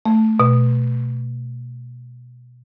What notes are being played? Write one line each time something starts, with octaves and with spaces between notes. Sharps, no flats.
A3
B2